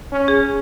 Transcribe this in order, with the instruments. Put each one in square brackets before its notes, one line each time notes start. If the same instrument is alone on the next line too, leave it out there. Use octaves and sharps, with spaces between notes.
[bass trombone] C#4
[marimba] G#4